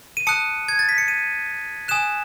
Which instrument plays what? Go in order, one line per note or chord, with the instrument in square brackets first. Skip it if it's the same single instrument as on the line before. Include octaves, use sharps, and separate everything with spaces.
[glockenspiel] D#7
A5 D#6 F#6 C#7
G#6
A6
B6
C#7
D#7
G#5 D#6 F#6 E7